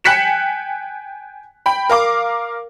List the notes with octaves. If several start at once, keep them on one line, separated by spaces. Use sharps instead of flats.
G5 G#5 F#6 B6 C#7 E7
G5 B5
A#4 F5 D6